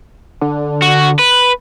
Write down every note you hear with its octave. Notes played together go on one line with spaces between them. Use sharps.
D3
F#4
B4